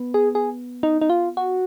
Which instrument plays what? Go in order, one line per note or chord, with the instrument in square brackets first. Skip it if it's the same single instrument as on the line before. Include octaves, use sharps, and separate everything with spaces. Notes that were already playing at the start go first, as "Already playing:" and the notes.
Already playing: [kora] B3
[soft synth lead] G#4
G#4
D#4
D#4
F4
F#4